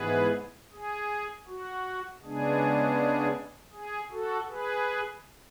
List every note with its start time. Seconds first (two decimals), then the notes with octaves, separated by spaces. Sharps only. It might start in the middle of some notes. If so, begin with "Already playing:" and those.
Already playing: G#2 E3 B3 G#4 B4
0.72 G#4
1.47 F#4
2.23 C#3 G#3 B3 D4 G#4
3.73 G#4
4.11 F#4 A4
4.48 G#4 B4